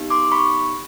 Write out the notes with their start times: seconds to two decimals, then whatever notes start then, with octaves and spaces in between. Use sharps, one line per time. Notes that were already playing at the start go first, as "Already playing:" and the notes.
Already playing: B3 D#4 G4
0.10 C6 D6
0.32 B5 C#6